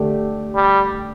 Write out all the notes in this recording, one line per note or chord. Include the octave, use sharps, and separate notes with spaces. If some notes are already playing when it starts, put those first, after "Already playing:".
Already playing: D3 A3 D4 G4
G3